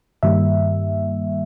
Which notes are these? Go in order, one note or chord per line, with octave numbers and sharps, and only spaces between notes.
G2 D#3 G3 A#3 E5